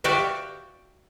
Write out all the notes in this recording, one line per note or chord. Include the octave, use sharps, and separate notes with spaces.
F#4 G4 D5 E5 F5